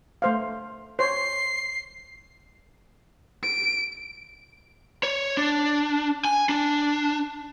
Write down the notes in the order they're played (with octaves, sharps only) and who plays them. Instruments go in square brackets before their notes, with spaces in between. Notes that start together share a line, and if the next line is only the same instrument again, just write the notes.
[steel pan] A3 C5 F5
[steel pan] C5 C#5 [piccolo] C7
[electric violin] D7
[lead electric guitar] C#5
D4
G#5
D4